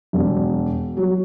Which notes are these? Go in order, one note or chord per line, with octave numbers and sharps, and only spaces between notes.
E1
F#3